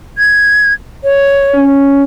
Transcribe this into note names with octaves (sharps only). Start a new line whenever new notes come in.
G#6
C#5
C#4